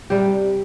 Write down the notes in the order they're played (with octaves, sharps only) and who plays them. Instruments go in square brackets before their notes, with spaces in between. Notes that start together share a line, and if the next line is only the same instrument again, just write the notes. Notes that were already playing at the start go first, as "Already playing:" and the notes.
[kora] C3 G3 G4